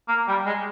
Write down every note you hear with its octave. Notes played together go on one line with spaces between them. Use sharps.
A#3
G3
G#3